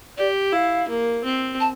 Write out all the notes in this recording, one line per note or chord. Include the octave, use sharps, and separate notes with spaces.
G4 D5
E4 F5
A#3
C4
A5